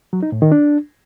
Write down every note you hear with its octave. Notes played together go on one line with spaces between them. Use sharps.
F#3
D#4
A2
D#3
D4